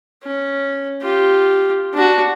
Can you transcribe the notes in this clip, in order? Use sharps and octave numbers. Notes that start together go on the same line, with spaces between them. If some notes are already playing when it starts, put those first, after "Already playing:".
C#4
F4 G4
D4 F#4